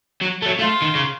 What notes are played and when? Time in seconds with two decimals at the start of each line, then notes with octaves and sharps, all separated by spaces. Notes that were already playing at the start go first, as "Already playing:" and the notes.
0.22 F#3
0.42 A3
0.46 F#3
0.59 A3 F4
0.82 D#3
0.95 C#3